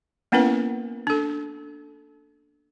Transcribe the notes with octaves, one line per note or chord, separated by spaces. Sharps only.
A#3 B3 C#4 E4 A#4 B4
D4 A4